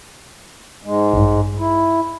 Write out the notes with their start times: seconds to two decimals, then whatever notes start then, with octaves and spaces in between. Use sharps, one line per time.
0.85 G#2 G#3
1.13 A1 G2
1.58 E4